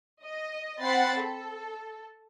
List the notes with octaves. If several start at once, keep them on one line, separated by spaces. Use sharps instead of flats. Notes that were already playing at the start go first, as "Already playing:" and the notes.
D#5
C4 F#5 G5 B5 A6 C7
A4